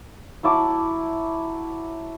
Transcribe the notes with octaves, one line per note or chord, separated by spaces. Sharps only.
F#3 E4 A5 D6